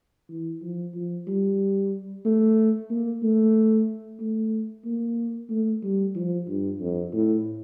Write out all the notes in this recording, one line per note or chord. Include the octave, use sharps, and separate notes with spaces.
E3
F3
F3
G3
A3
A#3
A3
A3
A#3
A3
G3
F3
G2
F2
A2